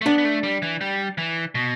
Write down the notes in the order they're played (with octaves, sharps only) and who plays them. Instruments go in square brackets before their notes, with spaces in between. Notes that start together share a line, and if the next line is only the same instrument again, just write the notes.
[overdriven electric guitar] A3
[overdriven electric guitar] B3 [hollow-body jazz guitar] D4
[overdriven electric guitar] B3
A3
G3
E3
G3
E3
B2